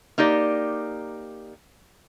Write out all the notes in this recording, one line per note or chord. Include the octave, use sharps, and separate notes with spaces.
A#3 D#4 G4 D5